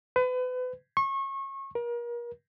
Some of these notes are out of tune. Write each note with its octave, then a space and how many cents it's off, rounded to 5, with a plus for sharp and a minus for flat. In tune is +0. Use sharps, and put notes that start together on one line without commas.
B4 +35
C#6 -30
A#4 +35